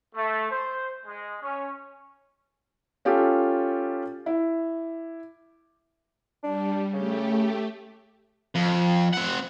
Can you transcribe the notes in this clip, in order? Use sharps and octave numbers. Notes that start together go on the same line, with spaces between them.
A3
C5
G#3
C#4
C#4 F4 G4 A4
E4
G3 D4
C#3 A3 G4
F2
C4 F#5